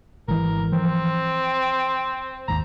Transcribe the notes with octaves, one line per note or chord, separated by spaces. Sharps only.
G#1 E3 A#4
E3 F3 C4
G#1 D#2 A#5